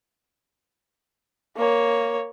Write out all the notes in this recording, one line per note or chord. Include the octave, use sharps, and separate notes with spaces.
A#3 C#5